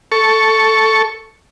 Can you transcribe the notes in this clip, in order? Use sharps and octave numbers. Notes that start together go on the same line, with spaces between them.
A4 C#6